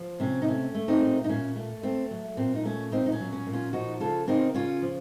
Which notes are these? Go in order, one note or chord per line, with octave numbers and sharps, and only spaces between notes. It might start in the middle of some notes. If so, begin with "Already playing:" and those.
Already playing: F3
C3 C#4
D#4
A3 C#4
A3
C4 D#4
A#2
D#4
A#2 C#4
A3
A3 C4
F#3
A#2 C4
D#4
A3 C#4
A#2 C4 D#4
D#4
C#4
F#3
C#4
A#2
C#4 F4
F3 D#4 F#4
C#3 F4 A4
A#3 C4 D#4
C#3 C#4 F4
F3